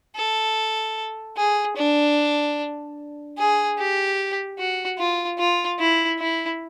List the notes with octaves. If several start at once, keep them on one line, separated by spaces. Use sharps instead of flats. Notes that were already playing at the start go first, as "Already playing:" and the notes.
A4
G#4
D4
G#4
G4
F#4
F4
F4
E4
E4